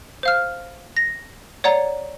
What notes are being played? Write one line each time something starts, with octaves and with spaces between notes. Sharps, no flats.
C5 F5 F6
A#6
C#5 D5 F#5 A#5